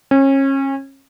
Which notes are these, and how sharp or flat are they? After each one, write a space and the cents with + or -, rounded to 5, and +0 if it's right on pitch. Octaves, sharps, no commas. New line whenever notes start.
C#4 -30